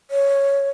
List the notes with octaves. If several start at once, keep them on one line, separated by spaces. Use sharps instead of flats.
C#5